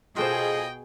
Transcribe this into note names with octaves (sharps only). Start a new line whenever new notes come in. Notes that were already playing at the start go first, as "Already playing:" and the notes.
B2 F4 G#4 A4 C5 D#5 G5